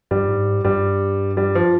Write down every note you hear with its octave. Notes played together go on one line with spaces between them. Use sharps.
G2 G3
G#2
G2 G3
G3
F3